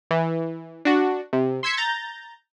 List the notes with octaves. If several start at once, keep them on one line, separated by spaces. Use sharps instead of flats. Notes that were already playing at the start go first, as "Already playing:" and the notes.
E3
D4 F#4
C3
C6 E6 G#6 B6 C#7
A#5 G6 A6